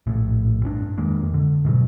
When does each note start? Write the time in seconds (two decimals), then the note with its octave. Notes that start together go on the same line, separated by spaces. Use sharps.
0.07 A#1 A2
0.63 G2 C#4 D4
0.98 F2 D#3 G#3 A#3
1.34 D3
1.65 G#2 B2 F#3